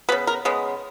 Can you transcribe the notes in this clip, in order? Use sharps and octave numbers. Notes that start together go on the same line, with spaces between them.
C#3 G#3 B3 B4
A#4
C#3 G#3 B3